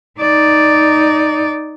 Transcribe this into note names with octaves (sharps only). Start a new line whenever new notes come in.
D#4 D5